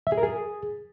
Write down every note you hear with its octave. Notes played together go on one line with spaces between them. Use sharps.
E5
G#4
A#4
G#4